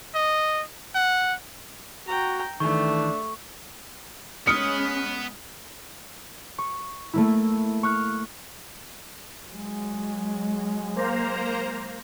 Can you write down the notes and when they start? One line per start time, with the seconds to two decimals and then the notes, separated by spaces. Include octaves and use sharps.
0.14 D#5
0.95 F#5
2.07 F#4 G5 A#5
2.60 D#3 E3 A3 D4 C#6
4.47 G#3 B3 C#4 D#6 F6 C#7
6.58 C#6
7.13 A3 A#3 E4
7.83 C#6 F6 F#6
9.49 F#3 G#3
10.96 A#3 C5 A#5